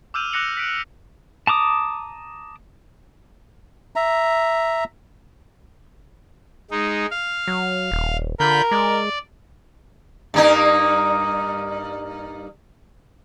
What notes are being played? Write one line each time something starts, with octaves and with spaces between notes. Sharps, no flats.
D6 E6 F6 G6 D#7 F7
D6 F#6 A#6 C#7 F7 F#7
B6 D7
A5 A#5 D6 D#6
E5 A#5
G#3 D#4
F5
F#3
D#1
D3 F4 A#4 B5 G6
G#3 D5
G2 A#3 D#4